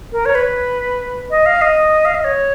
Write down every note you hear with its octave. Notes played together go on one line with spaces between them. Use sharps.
A#4
C#5
B4
D#5
F5
D#5
F5
D#5
C#5